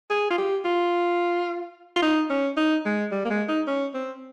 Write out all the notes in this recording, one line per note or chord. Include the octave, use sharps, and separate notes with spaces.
G#4
F4
G4
F4
F4
D#4
C#4
D#4
G#3
G3
A#3
G#3
D#4
C#4
C4